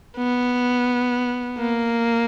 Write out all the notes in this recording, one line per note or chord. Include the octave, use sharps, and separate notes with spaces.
B3
A#3